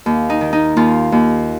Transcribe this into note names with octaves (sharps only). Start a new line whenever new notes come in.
D#2
D#4
D#3
D#4
D#2 F4
D#2